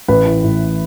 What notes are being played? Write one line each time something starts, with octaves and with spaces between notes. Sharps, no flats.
A1 B4
E3
A2